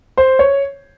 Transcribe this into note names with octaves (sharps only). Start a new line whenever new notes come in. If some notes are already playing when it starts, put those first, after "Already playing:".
C5
C#5